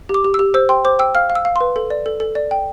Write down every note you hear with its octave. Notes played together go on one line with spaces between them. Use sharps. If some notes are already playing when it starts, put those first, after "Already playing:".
G4
D6
G4
E6
G4
C5 E6
G5 C6
C5 D6
G5 E6
F5 F6
F5
E6
F5
B4 C6
A4
D5
A4
A4
D5
G5